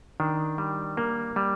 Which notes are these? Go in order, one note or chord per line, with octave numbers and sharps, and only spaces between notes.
D#3 D4
G3
A#3
G3